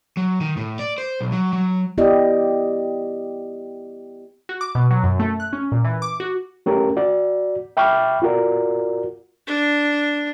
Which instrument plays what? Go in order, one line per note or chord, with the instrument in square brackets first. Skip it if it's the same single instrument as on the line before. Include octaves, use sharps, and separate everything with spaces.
[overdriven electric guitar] F#3
D#3
A2
D5
C5
B1
F#3
F#3
[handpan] B3 E4 G4 D5 D#5
[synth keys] F#4
D6
B2
F#3
F#2
A3
F#6
C#4
A#2
E3
D6
F#4
[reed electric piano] A3 C#4 G4 A#4
F#4 D5
E5 G5 B5 C#6 D6 F6
F4 F#4 A#4 D5
[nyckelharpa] D4